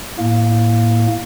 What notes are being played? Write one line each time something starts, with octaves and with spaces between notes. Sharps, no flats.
A2 A#3